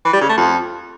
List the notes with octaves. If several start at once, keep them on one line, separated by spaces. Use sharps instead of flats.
E3
G3
C#3
A3
F2